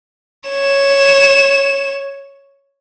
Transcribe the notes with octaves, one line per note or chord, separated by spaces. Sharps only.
C#5 E7